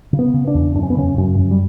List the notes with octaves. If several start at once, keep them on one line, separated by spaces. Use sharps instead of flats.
C#3
B3
C#3
D4
E2
F#2 D4
C#4
B3
C#3 C#4
F#2 C#4
F#2
G3